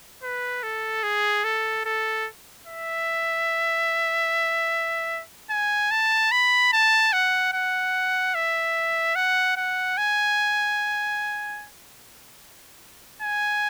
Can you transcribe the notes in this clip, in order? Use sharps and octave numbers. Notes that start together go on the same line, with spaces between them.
B4
A4
G#4
A4
A4
E5
G#5
A5
B5
A5
F#5
F#5
E5
F#5
F#5
G#5
G#5